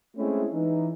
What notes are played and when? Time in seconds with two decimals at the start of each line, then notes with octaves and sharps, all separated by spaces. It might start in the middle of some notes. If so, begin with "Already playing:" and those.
0.17 G#3 A3 C4 C#4 E4
0.52 E3 D#4